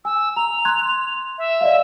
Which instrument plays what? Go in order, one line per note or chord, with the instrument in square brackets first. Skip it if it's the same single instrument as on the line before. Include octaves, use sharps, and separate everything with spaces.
[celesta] G#5 [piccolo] E6
[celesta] A#5 [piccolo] F7
[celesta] C6 F#6 G#6
[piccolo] E5
[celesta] D5 D#5 F5